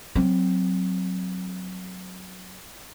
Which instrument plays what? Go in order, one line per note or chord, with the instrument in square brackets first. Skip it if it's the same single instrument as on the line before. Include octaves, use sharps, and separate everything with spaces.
[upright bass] F#3 C4